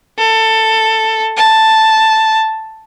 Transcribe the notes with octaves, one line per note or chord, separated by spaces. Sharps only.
A4
A5